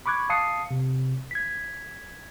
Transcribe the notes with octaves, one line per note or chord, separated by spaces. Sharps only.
B5 C#6 D6 F#6 G#6
F5 A5 D#6 C7 C#7
C3
G#6 B6